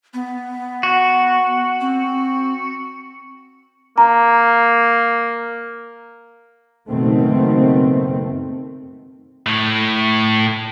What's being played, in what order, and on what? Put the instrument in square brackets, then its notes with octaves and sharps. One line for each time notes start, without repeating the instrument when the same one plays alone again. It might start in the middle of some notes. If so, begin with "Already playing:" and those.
[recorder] B3
[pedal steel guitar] F#4
[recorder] C4
[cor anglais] A#3 [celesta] A#5
[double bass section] F#1 B2 D#3 A3 C4
[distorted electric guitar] A2